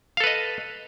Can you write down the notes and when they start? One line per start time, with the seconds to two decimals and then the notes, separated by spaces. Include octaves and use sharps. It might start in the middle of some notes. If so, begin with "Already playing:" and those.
0.17 F5
0.20 A4
0.24 B4
0.27 D#5